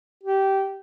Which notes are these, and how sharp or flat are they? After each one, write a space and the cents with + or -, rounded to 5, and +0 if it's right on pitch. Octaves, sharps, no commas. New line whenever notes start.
G4 -15